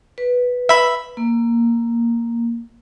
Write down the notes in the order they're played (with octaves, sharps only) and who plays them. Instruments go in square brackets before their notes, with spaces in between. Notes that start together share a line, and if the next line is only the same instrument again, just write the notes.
[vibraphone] B4
[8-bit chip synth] E5 B5
[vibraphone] A#3